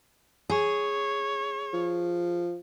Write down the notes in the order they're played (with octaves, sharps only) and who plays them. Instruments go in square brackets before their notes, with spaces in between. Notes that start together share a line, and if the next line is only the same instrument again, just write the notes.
[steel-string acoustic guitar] G#4 [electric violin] C#5
[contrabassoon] F3